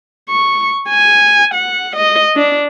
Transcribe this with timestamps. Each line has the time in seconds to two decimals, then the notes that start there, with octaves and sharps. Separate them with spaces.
0.30 C#6
0.89 G#5
1.54 F#5
1.96 D#5
2.36 D4